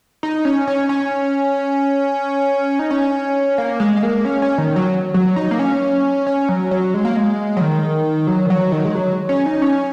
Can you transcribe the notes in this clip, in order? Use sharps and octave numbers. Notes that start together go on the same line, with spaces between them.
D#4
C#4
C#4
C#4
D#4
C#4
A#3
G#3
G#3
A#3
C#4
C#4
D#3
F#3
F#3
D#4
A#3
C#4
C#4
F#3
F#3
G#3
A#3
G#3
F#3
D#3
F#3
D#3
F#3
D#3
G#3
F#3
C#4
D#4
C#4